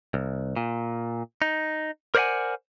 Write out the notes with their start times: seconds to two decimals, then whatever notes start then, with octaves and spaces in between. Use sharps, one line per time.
0.14 C2
0.56 A#2
1.42 D#4
2.15 A#4 C5 D5 D#5 F#5 G#5